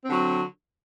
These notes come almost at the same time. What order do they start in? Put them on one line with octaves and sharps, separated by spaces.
C4 D3 F#3